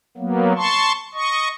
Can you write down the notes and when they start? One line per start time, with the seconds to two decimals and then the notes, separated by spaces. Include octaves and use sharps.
0.17 F#3 A#3 B3
0.56 A5 C6 C#6
1.14 D#5 C#6